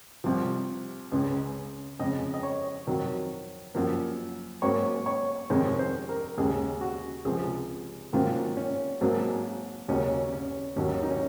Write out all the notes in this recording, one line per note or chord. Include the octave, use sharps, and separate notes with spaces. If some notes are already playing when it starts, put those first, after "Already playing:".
C2 C3 F3
C#2 C#3 G#3
F2 C#3 G#3 D#5
D#5
C#5
F2 D#3 F#3
F#2 F3 A#3
G#2 F#3 A#3 C#5
C#5
F2 C3 D#3 G#3 C#5
C5
A#4
D#2 C#3 G#3 G#4
F#4
C#2 C3 F3 G#4
G#2 D#3 F#3 A#3 F4
C#4
G#1 G#2 F#3 A#3
D#2 C#3 F#3 A#3 C#4
C#4
D#2 D#3 F#3 C#4
D#4
C#4